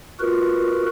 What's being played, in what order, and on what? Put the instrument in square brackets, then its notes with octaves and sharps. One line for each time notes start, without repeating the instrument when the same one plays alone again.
[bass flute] F4 [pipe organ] F#4 A#4 B4